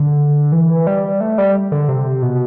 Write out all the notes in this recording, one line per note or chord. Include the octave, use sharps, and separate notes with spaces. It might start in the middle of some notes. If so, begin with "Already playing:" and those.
Already playing: D3
E3
G3
A3
G3
D3
C3
B2